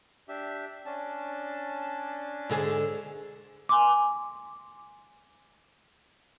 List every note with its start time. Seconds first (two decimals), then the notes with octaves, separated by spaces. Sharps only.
0.29 D4 G4 E5
0.86 C#4 D4 A5
2.49 G#2 D3 G#4
3.69 G#5 C6 D6